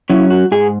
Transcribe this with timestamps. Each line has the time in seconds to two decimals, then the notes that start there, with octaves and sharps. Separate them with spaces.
0.10 F#3 C#4 E4
0.30 F#4
0.52 G#2 G#4